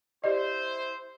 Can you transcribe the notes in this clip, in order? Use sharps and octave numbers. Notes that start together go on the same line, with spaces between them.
E4 G4 C5 D5 D#5